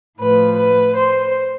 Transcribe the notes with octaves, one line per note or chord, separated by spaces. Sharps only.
A2 F3 B4
B4
C5